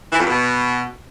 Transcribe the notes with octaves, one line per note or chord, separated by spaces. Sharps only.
E3
F2
G2
B2